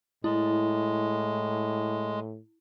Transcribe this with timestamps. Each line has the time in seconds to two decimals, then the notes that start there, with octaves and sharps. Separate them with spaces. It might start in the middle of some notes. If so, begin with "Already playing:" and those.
0.24 A2 G#3 E4